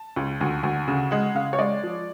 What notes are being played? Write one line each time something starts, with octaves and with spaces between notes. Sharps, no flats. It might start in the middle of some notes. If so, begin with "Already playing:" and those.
Already playing: A5
C#2
D2
D2
C#3
G#3 F#5
C#3 F5
C#5
G#3 D5
F3